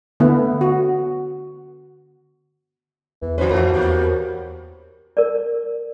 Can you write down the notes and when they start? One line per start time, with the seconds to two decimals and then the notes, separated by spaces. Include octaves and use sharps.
0.20 D3 A3 B3 E4
0.61 F#4
3.22 E2 E3
3.38 E3 G3 C#4 F#4 B4 C5
3.51 F2 G#2 A#3
3.73 E2 A#2 C#4 G4 B4
5.17 A#4 D5